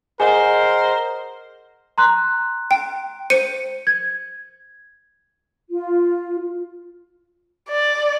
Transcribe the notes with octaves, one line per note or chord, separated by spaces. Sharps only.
G#4 A#4 C5 D#5 F#5 G#5
A#5 C6 F#6
G5
C5 C#7 D#7
G#6
F4
D5